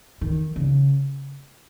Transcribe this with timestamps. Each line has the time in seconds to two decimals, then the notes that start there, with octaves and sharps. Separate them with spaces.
0.21 D#3
0.56 C#3